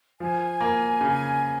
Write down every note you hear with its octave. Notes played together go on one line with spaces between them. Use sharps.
F3 G#5
A#3
C#3